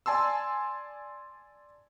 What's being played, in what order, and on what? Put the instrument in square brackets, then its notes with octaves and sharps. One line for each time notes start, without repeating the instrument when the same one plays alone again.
[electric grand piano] D5 G#5 A5 C6 E6